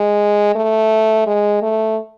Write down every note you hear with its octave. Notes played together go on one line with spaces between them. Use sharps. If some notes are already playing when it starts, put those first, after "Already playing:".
Already playing: G#3
A3
G#3
A3